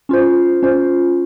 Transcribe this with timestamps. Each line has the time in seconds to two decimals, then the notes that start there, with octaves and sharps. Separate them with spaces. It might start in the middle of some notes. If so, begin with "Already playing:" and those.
0.09 C#4 F4 C5
0.63 C#4 F4 C5